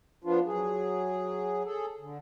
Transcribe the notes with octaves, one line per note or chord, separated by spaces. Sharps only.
F3 B3 D4 F4
F#3 G#4
G#4 A4
D3